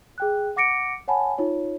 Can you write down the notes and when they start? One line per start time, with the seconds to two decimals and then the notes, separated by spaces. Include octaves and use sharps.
0.18 G#4 G5 F#6
0.56 F#5 D6 A#6 C#7 D7
1.08 C#5 F#5 G#5 A5 B5
1.38 D#4 F4 C#5